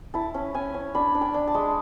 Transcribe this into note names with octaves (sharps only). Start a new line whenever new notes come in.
E4 A5
C#4
C#4 G#5
C#4
D4 B5
D4
G#5
D4
A5
G#3